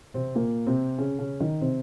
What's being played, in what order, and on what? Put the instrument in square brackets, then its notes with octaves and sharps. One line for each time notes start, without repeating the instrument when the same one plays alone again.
[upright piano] C3 C4
A#2 A#3
C3 C4
C#3 C#4
C#3 C#4
D#3 D#4
C3 C4